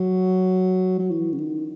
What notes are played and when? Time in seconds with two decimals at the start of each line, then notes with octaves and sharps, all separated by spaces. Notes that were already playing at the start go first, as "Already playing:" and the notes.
Already playing: F#3
0.99 F#3
1.11 E3
1.32 C#3
1.38 D#3